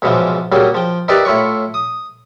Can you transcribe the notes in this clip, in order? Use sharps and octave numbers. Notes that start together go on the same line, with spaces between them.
B1 G#2 C#3 E3 F3
C#3 F#3 G3 A#3
F3 G5
D#4 E4 G4 A#4 B4 D5
A2 E4 F4 C#5 C#6
D#6